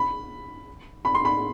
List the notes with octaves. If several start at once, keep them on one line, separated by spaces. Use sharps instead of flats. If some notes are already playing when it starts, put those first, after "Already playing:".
Already playing: B5
B5
C6
B5